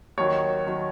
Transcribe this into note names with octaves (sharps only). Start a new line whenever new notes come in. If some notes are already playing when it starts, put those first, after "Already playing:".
D#2 D#3 F#3 C#5
D#3 F#3